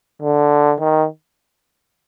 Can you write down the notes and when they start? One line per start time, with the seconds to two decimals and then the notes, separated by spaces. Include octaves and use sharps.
0.22 D3
0.80 D#3